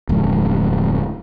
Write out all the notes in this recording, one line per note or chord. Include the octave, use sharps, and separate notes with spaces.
D1 F2 G#3